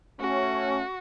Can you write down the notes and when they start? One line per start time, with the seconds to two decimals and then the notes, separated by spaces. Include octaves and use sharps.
0.20 A3 C#4 F#4